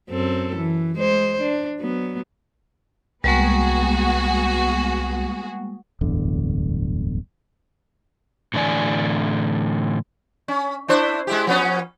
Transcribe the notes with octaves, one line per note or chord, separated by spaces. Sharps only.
F#2 C4 A4
E3
G#3 C5
D4
F#3 B3
C2 G3 G#3 A#3 B3 F#4 G#4
D1 G1 E2 D3
A2 D3 E3 D5 G#5
C#4
D4 E4 C5
G#3 E4 G4
F3 B3 C#4